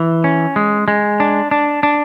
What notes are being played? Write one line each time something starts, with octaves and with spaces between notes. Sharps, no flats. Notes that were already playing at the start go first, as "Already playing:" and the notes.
Already playing: E3
C#4
G#3
G#3
D4
D4
D4